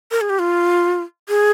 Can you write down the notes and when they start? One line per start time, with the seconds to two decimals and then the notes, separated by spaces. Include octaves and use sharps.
0.11 A#4
0.21 G#4
0.30 G4
0.39 F4
1.29 G#4